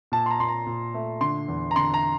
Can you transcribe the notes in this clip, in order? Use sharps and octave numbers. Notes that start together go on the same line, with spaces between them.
A#2 A5
C6
A#5
A#2 C6
A#5
A#2
A3
D3 C6
E2
A#5
D3 C6
A#5